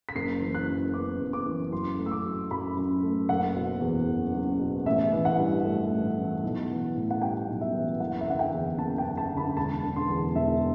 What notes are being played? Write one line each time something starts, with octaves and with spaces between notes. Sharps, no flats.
B6
F#1 C7
E3
F#6
F#2
B3 D6
F#1
D6
E3
F#2 C6
A3
E6
D6
F#3
F#2 B5
F#2
A3
F#1 F#5
B2
E2
F#1
F#1
B2
A1 E5
E3
F#5
G2
A3
A1
E3
B1
E3
A2
F#5
G3 G5
B1
E5
E3
F#1 F#5
E5
D3 F#5
G5
E2
F#1 A5
G5
F#1
A5
D3
B5
E1 A5
D3
C6
E2
E1 E5